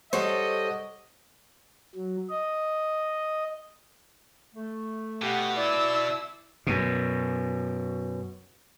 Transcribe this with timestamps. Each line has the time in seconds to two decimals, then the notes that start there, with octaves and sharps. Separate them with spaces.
0.13 G3 A4 C5 C#5 D#5 F#5 C#6
1.95 F#3
2.29 D#5
4.55 A3
5.22 B2 G4 F#5
5.57 E4 D5 E6
6.67 F#2 B2